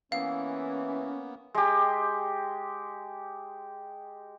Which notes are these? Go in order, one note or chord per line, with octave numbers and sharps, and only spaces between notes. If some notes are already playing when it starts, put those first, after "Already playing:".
E3 A#3 B3 C#4 F5
G#3 G4